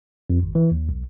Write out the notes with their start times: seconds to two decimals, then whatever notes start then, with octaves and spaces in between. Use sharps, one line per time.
0.30 F2
0.43 G#1
0.55 E3
0.71 D#2
0.89 B1